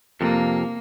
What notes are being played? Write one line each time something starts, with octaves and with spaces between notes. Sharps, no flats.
F2 C3 A#3